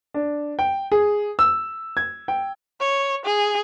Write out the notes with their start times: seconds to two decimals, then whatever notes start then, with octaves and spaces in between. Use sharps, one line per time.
0.14 D4
0.59 G5
0.92 G#4
1.39 E6
1.97 G#6
2.28 G5
2.80 C#5
3.25 G#4